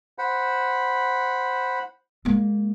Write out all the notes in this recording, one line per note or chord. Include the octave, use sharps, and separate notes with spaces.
C5 F#5 B5
G#3 A#3